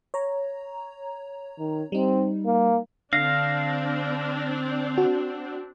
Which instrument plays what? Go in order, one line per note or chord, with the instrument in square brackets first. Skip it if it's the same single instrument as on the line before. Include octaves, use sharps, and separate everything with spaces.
[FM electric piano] C#5 A#5
[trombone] D#3
[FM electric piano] G3 D#4 [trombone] C4
[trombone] A#3
[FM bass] D3 [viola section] C4 D4 [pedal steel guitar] F5 [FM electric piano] A#6
[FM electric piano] F#4